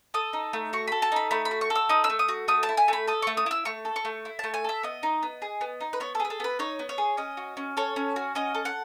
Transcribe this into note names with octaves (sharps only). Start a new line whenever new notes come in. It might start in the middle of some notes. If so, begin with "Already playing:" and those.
A4 D#6
D#4
A3
F#4 C#6
A4 B5
A5
D#4 B5
A3 B5
B5
F#4
C#6
A4
E6
D#4 D#6
E6
A3
D#6
F#4
A3 D#6
A5
E4
G#5
A3 B5
A4 D#6
A3 C#6
D#6
E4 E6
A3 C#6
A4
C#6
A3
E4
A3 A5
G#5
A4 E5
B3 D#5
D#4
B3
G#4
B3
D#4
B4
B3 C#5
A4
G#4 B4
A4
B3 B4
D#4 C#5
B3
C#5
G#4
C#4 D#5
F#4
C#4
A4 C#5
C#4
F#4
C#4 D#5
A4
F#5